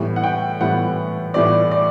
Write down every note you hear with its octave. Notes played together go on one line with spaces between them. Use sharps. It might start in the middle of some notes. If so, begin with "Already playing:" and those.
Already playing: A2 E3 G3 B3
F#5
G5
A2 E3 G3 B3 F#5
A2 E3 G3 B3 D5
D5